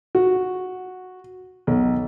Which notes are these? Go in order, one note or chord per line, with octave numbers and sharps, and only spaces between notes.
F#4
B1